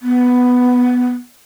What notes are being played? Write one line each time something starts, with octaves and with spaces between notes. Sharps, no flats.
B3